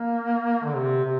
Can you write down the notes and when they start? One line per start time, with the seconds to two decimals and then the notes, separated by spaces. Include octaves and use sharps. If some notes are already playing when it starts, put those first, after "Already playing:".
Already playing: A#3
0.64 D3
0.76 C3
1.04 C3